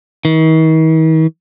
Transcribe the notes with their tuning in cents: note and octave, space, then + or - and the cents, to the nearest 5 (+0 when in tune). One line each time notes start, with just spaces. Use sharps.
D#3 +45